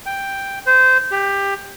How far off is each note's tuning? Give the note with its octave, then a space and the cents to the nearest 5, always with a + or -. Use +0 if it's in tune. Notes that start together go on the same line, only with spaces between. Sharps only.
G5 +5
C5 -20
G4 +15